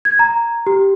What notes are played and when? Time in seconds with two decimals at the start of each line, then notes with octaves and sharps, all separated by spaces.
0.05 G#6
0.19 A#5
0.67 G4